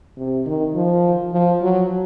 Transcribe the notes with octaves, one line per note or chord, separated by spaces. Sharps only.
C3
D#3
F3
F3
F#3